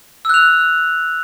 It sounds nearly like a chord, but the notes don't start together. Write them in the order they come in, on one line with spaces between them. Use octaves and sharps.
E6 F#6 F7